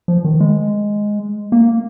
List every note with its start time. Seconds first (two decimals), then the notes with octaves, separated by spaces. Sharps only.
0.08 F3
0.25 D#3
0.40 G#3
1.52 A#3